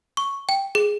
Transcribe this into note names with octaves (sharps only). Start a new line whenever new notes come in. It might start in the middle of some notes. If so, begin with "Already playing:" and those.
C#6
G5
G#4